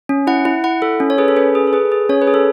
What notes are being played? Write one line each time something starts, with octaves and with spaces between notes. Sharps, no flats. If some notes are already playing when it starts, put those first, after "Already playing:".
C#4
E4 F#5
E4
E4 F#5
A4
C#4
C#5
G#4 B4
A4
C#4 B4
G#4
A4
G#4 B4
G#4
C#4 C#5
B4
G#4
A4